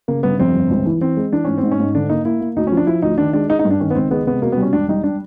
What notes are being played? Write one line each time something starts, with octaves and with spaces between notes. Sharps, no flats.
C#3 A#3
G1 B3
F2 C4
G1
C#2
E3
E3 C4
G#3
E3 D4
G#2 C#4
G#2 C4
C#4
G#2
D3 D4
A#3 D#4
A#3 E4
A#3
D2 D#4
C#4
F3
D4
F3 E4
D2 D#4
D#3 D4
G#3 D4
G#3 D#4
D#4
G2
D4
D#3 C#4
B3
C#2 C4
G#3 B3
C3 B3
B2 A#3
B3
G3
C#4
E1 D4
G3 D#4
D4